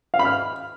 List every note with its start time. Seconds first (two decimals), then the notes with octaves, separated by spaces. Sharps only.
0.14 F5
0.19 B5
0.25 F6